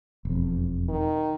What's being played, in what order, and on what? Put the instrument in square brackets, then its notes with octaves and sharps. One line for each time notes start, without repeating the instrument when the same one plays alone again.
[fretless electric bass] E1 F2
[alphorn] D#3